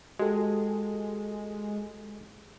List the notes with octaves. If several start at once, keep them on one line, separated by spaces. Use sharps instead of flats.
G#3 F#4 G4 A4